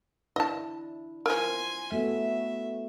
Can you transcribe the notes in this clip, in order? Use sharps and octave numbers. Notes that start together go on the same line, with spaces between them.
D4 E4 D#5 A5
F3 A#4 G#5 C6
A3 B3 F#4 E5